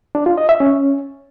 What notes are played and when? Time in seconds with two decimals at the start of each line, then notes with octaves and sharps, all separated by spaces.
0.15 D4
0.26 F4
0.38 D#5
0.49 E5
0.60 C#4